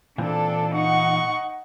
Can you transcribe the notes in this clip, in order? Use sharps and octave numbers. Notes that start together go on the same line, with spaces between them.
A#2 E3 C4 D4 A4
D#4 F#5 C#6